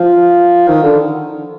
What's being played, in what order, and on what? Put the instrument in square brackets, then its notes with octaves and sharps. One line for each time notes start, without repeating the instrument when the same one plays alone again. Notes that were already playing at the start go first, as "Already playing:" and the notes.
Already playing: [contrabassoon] F3
D#3
D3